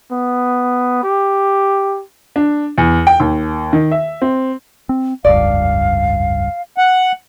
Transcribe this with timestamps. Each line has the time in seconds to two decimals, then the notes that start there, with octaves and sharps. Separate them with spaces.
0.11 B3
1.03 G4
2.36 D4
2.78 E2
3.07 G5
3.20 D#2
3.73 D#3
3.92 E5
4.22 C4
4.89 C4
5.25 F1 C#2 G2 D5 F5
6.78 F#5